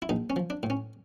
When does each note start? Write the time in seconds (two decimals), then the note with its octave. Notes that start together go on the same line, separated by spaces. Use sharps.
0.02 E4
0.09 A#1 D#4
0.30 C#4
0.36 F3
0.50 D4
0.63 A2
0.70 C#4